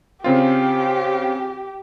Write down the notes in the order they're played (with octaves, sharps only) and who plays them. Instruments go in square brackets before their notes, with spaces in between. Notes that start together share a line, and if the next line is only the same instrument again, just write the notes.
[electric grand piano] C#3 C4 F4 [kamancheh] G4